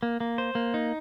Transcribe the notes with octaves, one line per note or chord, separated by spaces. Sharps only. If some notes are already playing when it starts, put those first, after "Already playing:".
A#3
A#3
C5
A#3
D#4